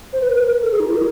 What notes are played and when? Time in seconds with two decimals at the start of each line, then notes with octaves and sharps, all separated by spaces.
0.13 C5
0.21 B4
0.30 A#4
0.38 B4
0.46 A#4
0.63 A4
0.72 G#4
0.80 D#4
0.88 E4
0.96 A#4